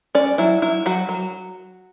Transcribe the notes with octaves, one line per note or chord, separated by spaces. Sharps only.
C#4 D5
F#3 E4
F#3 E4
F#3 F#4
F#3